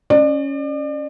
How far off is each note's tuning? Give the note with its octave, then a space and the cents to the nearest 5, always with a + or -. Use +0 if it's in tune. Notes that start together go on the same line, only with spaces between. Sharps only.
C#4 +0 D5 +35